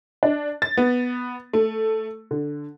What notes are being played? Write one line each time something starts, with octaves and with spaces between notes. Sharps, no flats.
D4
A6
B3
A3
D3